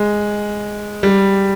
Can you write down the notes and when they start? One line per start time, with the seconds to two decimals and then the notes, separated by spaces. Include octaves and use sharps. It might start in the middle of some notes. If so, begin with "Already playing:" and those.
Already playing: G#3
1.03 G3